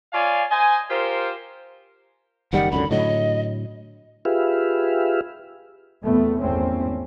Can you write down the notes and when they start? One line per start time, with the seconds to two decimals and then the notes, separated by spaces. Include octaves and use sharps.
0.13 F4 C#5 D5 F5 G#5
0.51 C5 D#5 G#5
0.90 F4 G4 A#4 C5
2.53 F#1 D#3 G3 F#5
2.72 C#2 F#2 D3 B5
2.91 A2 D3 F#3 D#5
4.25 F4 G4 G#4 B4 E5 F5
6.05 E2 C3 A3 B3
6.40 G#1 E2 A3 C4 C#4